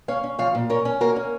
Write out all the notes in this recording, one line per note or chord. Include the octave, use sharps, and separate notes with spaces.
C#4 C#5 F5
C#4
F3 C#5 F5
A#2
C#4 A#4 C#5
C#4
A#3 F#4 A#4
C#4